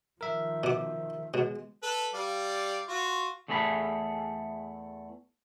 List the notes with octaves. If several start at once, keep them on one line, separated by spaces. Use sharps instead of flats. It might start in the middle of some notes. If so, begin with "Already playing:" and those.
D#3 F3 A#4 E5
B2 D6
B2 G#3
A4 B4
G3 D5 F5
F4 F#4
E2 A3 G#4 A4 A#5 B5